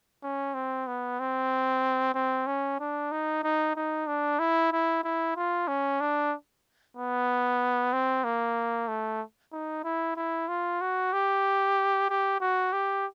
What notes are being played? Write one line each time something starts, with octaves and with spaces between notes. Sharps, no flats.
C#4
C4
B3
C4
C4
C#4
D4
D#4
D#4
D#4
D4
E4
E4
E4
F4
C#4
D4
B3
C4
A#3
A3
D#4
E4
E4
F4
F#4
G4
G4
F#4
G4